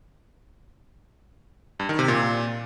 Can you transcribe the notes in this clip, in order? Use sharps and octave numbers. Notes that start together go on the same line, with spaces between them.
G2
D#3
C3
A#2